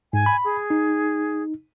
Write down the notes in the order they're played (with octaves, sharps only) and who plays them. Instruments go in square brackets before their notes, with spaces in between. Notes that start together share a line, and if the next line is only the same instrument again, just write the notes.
[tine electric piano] G#2 [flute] G#5
[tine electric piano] B5
[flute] G#4
[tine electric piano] D#4